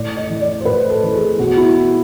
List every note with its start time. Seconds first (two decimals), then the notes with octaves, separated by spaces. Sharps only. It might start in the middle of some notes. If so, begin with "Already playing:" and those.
Already playing: A2 D5
0.17 D#5
0.29 E3
0.41 D5
0.61 C5
0.65 A2 B4
0.90 A4
1.03 E3
1.14 G#4
1.39 B2 F#4
1.57 E4